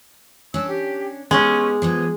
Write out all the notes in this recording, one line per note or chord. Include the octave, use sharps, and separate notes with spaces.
C#4 D4 E6
G4
G#3 B3 C#4 D#4 G4
F3 G3 B3 G#4